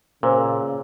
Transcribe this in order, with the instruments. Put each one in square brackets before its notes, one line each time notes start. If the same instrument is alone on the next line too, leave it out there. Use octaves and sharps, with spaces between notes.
[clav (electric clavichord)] A#2 [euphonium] C#3 [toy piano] A#4 C5